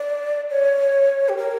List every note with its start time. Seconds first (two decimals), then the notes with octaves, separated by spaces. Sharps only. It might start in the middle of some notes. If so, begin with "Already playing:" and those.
Already playing: D5
0.50 C#5
1.29 G4
1.37 A#4